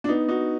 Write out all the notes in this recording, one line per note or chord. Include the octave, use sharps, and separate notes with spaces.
D4
B3 D#4
D#4 F#4